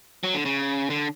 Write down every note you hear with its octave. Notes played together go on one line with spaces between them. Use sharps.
F#3
D3
C#3
D3